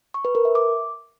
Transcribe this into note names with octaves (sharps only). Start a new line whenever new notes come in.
C#6
B4
A#4
E5
D6